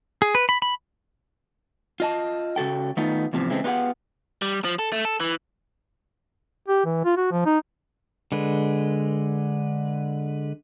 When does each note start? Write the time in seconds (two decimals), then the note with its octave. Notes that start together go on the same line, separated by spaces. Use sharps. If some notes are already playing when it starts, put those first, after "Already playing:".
0.22 G#4
0.35 B4
0.49 B5
0.62 B5
2.00 F4 D#5 A5
2.56 C#3 F#4 A4 G5
2.97 D#3 A3 B3 D#4 F4
3.33 E2 A2 C3 F3
3.50 C#3 E3 G#3 A3 C4
3.64 B3 D#4 F4 G4 G#4 F#5
4.42 G3
4.64 F3
4.79 A4
4.92 A3
5.05 A4
5.20 E3
6.68 G4
6.86 E3
7.05 F4
7.17 F#4
7.31 F3
7.46 D#4
8.32 D3 G#3 B4